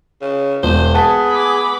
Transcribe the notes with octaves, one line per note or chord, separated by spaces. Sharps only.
C#3
E1 C5
B3 G#4 A5 B6
B5 D6